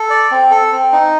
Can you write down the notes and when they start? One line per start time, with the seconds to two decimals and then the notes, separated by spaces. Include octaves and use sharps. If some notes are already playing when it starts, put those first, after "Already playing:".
Already playing: A4
0.10 D5
0.31 C4
0.51 A4
0.72 C4
0.92 D#4